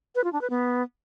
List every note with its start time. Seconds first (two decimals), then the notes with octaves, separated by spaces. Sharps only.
0.15 B4
0.24 F4
0.33 D4
0.41 B4
0.50 B3